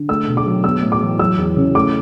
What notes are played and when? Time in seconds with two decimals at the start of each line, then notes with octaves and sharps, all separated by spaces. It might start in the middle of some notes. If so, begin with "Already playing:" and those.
Already playing: D3
0.08 A3 E6
0.28 B2
0.37 D6
0.46 F#3
0.64 B3 E6
0.82 A2
0.92 D6
1.01 E3
1.19 F#3 E6
1.38 E2
1.56 C#3
1.75 A3 D6